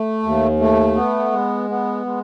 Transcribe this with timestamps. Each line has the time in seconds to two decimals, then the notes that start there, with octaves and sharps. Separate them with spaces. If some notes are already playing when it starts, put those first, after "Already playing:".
Already playing: A3
0.23 D#2
0.60 A3
0.96 B3
1.33 G#3
1.70 B3
2.06 G#3